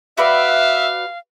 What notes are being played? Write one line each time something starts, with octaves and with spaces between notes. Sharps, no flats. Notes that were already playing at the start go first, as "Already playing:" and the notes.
F#4 B4 D5 E5 F5